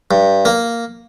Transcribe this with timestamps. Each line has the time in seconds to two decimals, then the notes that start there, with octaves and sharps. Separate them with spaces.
0.11 G2
0.45 A#3